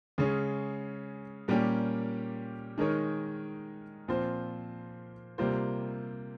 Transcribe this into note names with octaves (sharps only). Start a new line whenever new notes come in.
C#3 G#3 C#4 G#4
A#2 G3 A#3 C#4 G4
D#3 G#3 D#4 A#4 C#5
A#2 F3 C4 F4 C5
C3 G3 A#3 F4 C5